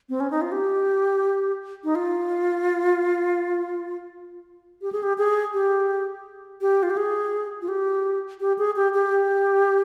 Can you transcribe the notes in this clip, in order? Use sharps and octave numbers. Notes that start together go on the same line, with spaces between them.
C4
C#4
D#4
F4
G4
D#4
F4
G4
G#4
G4
G#4
G4
G4
F4
G4
G#4
F4
G4
G4
G#4
G4
G4